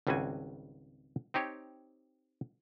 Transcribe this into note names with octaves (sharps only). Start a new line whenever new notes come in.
G#1 C#2 G3 C4 F#4 G#5
C4 D#4 G4 C#5